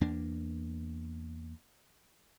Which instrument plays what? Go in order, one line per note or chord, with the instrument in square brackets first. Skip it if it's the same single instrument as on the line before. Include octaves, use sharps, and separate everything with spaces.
[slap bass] E2 A#3 D4